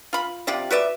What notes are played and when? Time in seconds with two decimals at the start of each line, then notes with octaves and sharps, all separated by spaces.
0.13 F4 B5
0.47 C3 F4 G4 D5
0.71 F#4 B4 D5 E5